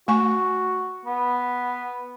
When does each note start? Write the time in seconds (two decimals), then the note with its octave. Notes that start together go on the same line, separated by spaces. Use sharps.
0.08 A3 F#4 G#5 C#6
1.06 B3